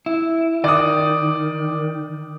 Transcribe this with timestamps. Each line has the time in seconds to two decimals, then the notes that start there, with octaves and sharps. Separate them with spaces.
0.06 E4
0.64 D#3 D5 D#6